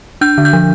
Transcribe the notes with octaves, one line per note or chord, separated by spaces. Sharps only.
D4 G6
D3
G6
F3